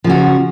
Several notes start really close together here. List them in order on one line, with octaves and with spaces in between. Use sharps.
F3 C#3 F#4